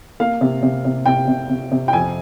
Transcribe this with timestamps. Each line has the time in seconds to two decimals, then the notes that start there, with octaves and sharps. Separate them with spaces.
0.20 A#3 F5
0.41 C3
0.63 C3
0.85 C3
1.06 C3 G5
1.28 C3
1.50 C3
1.72 C3
1.88 G5
1.93 F2 G#5